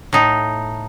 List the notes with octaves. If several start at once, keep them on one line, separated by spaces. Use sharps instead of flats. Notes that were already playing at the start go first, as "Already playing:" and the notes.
A2 D#4